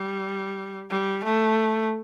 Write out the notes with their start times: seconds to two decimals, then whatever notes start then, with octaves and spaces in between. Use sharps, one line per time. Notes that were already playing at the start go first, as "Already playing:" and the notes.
Already playing: G3
0.90 G3
1.24 A3